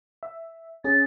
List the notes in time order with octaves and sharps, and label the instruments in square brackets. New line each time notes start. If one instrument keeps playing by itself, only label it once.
[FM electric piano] E5
[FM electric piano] C#4 G#4 [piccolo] A6